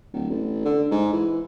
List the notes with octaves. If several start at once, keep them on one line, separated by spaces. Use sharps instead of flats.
D1
A1
D3
G#2
E3